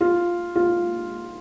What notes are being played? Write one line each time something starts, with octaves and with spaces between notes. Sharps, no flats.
F4
F4